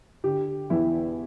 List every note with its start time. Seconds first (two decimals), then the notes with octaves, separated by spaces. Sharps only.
0.24 D3 G4
0.70 E2 E4